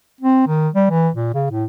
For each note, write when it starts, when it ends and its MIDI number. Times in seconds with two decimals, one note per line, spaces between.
0.21 0.45 60
0.47 0.69 51
0.75 0.86 55
0.90 1.09 52
1.15 1.33 46
1.34 1.46 49
1.51 1.65 45